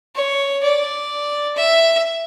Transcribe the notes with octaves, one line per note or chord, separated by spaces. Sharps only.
C#5
D5
E5